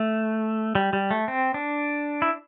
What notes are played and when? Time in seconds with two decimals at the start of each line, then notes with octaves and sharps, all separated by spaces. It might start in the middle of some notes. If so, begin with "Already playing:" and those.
Already playing: A3
0.75 G3
0.93 G3
1.11 A3
1.28 C4
1.54 D4
2.22 E4